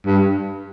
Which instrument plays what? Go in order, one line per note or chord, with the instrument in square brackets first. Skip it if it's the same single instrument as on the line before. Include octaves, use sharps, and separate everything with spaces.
[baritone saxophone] G2